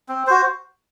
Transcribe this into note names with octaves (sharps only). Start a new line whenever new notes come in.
C4
F#4 C5